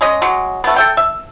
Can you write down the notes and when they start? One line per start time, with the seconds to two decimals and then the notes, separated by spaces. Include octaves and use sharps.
0.01 G#3 C#4 D#5
0.22 F#3 G#3
0.64 A3 B3
0.76 A4 E5 G5
0.97 E5